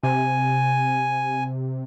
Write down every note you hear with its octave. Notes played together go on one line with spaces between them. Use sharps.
C3 G#5